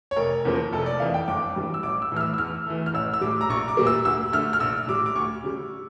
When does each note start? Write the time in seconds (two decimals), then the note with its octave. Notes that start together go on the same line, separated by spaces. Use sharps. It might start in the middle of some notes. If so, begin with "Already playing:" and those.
0.11 C#5
0.17 F1 A#4
0.45 E2 C#3 F3 A#3
0.73 F1 A4
0.86 D5
1.00 F2 E3 F5
1.14 G5
1.28 G1 D6
1.56 G2 E3 G3
1.74 E6
1.83 A1 D6
2.02 E6
2.12 A2 E3 A3 F6
2.21 E6
2.34 E6
2.38 E2 F6
2.66 E3 A3
2.86 F6
2.94 A1 E6
3.14 E6
3.21 A2 G3 D6
3.41 A#5
3.49 A#1 C#6
3.68 D6
3.77 A#2 G3 A#3
3.87 E6
4.05 D2 E6
4.32 D3 A3 F6
4.53 F6
4.60 A#1 E6
4.88 A2 G3 D6
5.06 D6
5.15 D2 C#6
5.43 C#3 G3